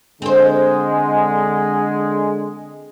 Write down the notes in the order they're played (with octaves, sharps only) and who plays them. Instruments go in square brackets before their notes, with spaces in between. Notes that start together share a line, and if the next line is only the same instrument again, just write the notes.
[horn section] D3 G#3 [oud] C4 C5